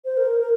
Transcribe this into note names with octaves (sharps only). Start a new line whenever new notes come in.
C5
A#4
A#4